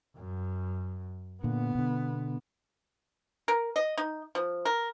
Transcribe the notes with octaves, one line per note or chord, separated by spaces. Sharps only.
F#2
A#2 D3 B3
B2 D3
A#4
D#5
D#4
F3
A#4